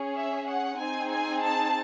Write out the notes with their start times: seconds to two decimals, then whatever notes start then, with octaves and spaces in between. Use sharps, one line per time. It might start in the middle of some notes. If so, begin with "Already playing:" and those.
Already playing: C#4 G#4
0.16 E5
0.47 F#5
0.79 C4 D#4 G#4 G#5
1.11 G#5
1.43 A5